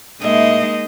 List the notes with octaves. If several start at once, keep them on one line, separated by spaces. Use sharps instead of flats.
A2 G#3 A#3 D#4 D#5 E5